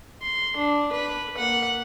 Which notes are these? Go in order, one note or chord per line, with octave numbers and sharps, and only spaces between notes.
C6
D4
B4
A#3 F#5